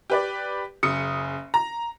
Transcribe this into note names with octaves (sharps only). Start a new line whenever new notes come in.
G4 B4 D5
F#1 C#3 D#6 C#7
A#5